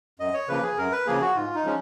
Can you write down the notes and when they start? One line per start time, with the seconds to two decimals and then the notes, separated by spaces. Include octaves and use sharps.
0.20 F#2 D#5
0.34 C#5
0.48 C#3 F3 A#3 B4
0.63 G#4
0.78 F#2 A#4
0.92 B4
1.07 C#3 F3 A#3 G#4
1.21 F#4
1.35 G#2 F4
1.55 D#4
1.65 F3 G#3 C#4